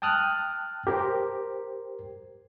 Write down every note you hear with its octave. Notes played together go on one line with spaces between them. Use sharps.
G5 A5 D#6 F6 F#6
G4 A#4 C5